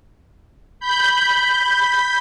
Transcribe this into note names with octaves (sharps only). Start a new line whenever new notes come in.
B5 G6